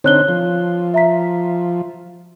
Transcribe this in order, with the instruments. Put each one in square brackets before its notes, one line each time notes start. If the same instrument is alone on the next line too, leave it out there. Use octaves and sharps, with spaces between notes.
[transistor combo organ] D3 C4 D#4 [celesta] C#5 F#6 G7
[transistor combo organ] F3
[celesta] E5 A#5 B6